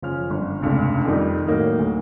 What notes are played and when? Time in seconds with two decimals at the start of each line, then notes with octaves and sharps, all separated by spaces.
0.02 F#1 F3 C#4 F6
0.30 G1
0.61 F1 C#2 G2 C3
1.05 F2 D#3 G3 D#4
1.47 A2 F#3 A#3 D#4
1.79 D2